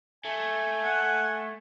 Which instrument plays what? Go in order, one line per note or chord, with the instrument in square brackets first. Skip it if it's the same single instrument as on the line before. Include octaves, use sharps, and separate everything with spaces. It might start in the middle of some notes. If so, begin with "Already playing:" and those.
[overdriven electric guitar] A3 [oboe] G#5
[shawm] F#5